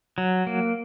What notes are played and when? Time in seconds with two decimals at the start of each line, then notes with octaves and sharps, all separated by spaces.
0.18 F#3
0.47 A#3